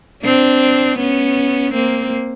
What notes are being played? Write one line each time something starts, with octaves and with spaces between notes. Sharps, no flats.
C4 D4
B3 C#4
A#3 C4